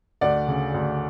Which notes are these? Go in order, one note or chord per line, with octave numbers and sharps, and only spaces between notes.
D2 D5 F#5
C#3
D2